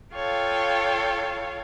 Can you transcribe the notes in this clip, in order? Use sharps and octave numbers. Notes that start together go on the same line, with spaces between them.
F4 A4 C#5 F5 G5